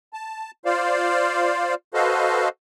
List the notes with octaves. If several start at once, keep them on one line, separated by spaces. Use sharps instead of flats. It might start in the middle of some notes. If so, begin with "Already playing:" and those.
A5
F4 C5 D5 F5
F#4 A4 B4 C5 D#5 F5